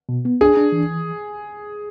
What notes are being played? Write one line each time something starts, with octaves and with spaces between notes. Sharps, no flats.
B2
B3
D4 G#4
D4
E3